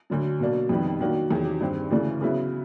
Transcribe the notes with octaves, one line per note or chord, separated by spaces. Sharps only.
D2 D3 F#3
B2 F#3 A#3 D4
F2 C3 D#3 G3 B3
D#3 F#3 A#3 D4 F#4
E2 C3 D#3 F#3
G2 D#3 G3 C4
D2 C#3 E3 A3 D4
C#3 F#3 B3 E4